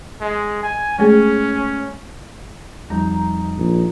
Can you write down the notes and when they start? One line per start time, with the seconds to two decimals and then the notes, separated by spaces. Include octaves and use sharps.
0.21 G#3
0.63 G#5
0.98 G#3 A3 C#4 G#4
2.90 F2 G3 D#4 A#5
3.56 A#1